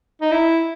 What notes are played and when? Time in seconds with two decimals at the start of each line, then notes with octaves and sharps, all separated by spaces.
0.22 D#4
0.32 E4